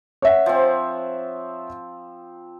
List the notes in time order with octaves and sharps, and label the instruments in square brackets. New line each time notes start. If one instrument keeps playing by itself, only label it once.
[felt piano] C#5 E5 F#5
[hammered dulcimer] F3 C4